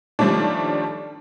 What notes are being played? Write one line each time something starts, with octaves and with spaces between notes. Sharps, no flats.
D#3 F3 G3 A3 C#4 D4